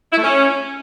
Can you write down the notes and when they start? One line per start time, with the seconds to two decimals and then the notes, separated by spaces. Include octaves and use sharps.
0.12 E4
0.18 A3
0.24 C#4